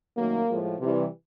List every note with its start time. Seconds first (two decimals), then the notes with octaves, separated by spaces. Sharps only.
0.16 F#2 D#3 F#3 A3 A#3
0.48 A2 F3 G#3
0.80 C3 E3 G3